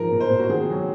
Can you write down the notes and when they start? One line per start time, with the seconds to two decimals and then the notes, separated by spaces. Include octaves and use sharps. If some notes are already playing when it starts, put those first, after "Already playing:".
Already playing: G#2 F3 A#4
0.11 A#2
0.20 C5
0.30 A#2
0.40 F#4
0.49 D#3 G#4
0.70 F#3